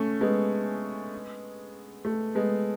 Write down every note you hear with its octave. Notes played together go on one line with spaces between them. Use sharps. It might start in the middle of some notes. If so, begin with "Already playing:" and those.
Already playing: A3 C#4
G#3 B3
A3
G#3 B3